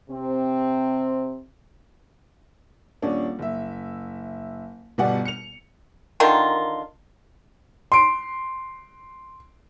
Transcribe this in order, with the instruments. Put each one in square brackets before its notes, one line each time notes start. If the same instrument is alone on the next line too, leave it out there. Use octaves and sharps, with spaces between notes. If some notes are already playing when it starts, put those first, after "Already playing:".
[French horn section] C3 C4
[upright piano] D#1 C#4 D4
F#1 E5
G1 B2 G3 D5 F#5
C#7 F7
[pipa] D3 D#3 F4 A#4
[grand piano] C6 D7